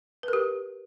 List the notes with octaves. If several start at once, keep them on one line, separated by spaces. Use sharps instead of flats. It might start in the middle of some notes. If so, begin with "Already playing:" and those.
G4 A#4 B4